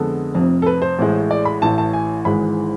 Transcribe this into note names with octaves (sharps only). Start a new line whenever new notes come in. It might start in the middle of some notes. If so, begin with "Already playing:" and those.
Already playing: F2 D3 G#3 B3 A4
F1 F2 C3
A4
B4
C5
A1 A2 G#3
D5
B5
A1 A2 E3 A5
A5
G#5
G#1 G#2 E3 G#3 B5